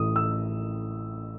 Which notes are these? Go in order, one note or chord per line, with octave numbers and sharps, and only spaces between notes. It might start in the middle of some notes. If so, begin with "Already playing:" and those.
Already playing: A1 A2 E3 D#6
E6